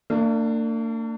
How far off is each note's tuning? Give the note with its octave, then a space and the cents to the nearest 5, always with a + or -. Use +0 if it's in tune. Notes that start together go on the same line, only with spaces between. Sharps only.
A#3 -45 D4 +15